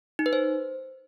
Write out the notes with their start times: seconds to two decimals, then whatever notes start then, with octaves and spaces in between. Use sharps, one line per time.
0.19 D#4
0.26 B4
0.33 C5